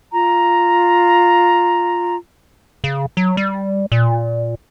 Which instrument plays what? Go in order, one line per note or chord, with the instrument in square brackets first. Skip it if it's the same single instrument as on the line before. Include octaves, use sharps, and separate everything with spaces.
[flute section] F4 A#5
[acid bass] C#3
F#3
G3
A#2